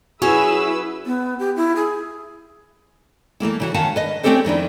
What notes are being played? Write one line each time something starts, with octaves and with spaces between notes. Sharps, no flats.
C#4 E4 F#4 G#4 B4 E6
B3
G4
E4
G#4
E3 A3 A#3 E4
C#3 E3 F#4
D#3 C#4 F5 F#5 A5
B4 D#5
A3 C4 C#4 G4 A4 C5
F2 D#3 D4 E4